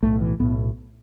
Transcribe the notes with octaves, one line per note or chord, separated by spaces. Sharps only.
B1 A2 A3
E3
B1 A2 B3